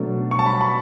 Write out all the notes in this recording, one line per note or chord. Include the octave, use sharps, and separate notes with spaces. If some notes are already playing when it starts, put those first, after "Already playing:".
Already playing: B2 F#3 A3 D4
C#6
A5
B5
B5